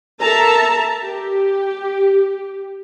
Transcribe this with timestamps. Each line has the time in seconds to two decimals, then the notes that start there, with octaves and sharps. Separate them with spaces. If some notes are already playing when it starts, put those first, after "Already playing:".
0.21 A4 A#4 E5 A5 A#5
1.02 G4